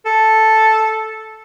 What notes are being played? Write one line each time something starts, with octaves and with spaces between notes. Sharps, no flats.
A4